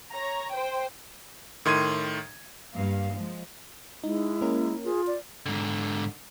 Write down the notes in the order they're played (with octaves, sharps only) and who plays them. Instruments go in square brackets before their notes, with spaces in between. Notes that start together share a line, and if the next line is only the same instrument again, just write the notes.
[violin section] C#5 A#5
C5 G5
[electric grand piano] A2 D#3 C6 G#6 D#7
[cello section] G2 A#3 F5
F3 G#3
[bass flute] G#3 [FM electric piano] D#4 [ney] E4
[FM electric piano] A#3 C#4 A#4
[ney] F4 [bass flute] G#4
[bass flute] D5
[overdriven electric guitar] G#2 D3